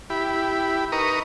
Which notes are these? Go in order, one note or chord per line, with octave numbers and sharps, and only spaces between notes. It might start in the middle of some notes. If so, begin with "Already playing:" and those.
E4 G4 B5
D#4 A#4 B4 A#5 C#6 D#6